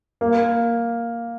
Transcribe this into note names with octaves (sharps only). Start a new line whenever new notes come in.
A#3